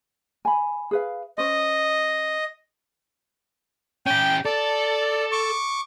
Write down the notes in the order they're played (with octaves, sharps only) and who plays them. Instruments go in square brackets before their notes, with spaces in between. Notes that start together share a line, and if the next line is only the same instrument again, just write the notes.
[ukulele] G#5 B5
G#4 B4 F5
[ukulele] C#4 C5 [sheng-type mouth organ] D#5
[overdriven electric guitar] C#4 G4 [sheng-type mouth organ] G5
[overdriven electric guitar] A4 [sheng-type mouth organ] D5
[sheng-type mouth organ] C#6 D6